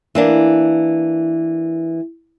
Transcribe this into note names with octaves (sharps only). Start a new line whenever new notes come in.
E3 A#3 D4